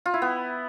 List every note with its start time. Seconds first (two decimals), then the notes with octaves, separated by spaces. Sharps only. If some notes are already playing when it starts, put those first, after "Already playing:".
0.06 F4
0.14 E4
0.22 B3